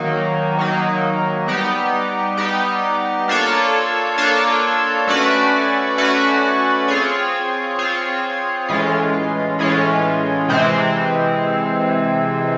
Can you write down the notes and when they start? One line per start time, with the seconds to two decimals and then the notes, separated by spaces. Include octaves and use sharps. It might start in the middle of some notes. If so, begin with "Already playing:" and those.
Already playing: D#3 F#3 A#3 D#4
0.57 D#3 F#3 A#3 D#4
1.47 G3 B3 D#4 G4
2.37 G3 B3 D#4 G4
3.28 A#3 D4 F4 A4 C#5
4.18 A#3 D4 F4 A4 C#5
5.08 A3 C#4 F#4 B4 D5
5.98 A3 C#4 F#4 B4 D5
6.88 C4 F4 G#4 C#5
7.79 C4 F4 G#4 C#5
8.68 A2 E3 G#3 C#4 F4
9.59 A2 E3 G#3 C#4 F4
10.49 C3 E3 G#3 C4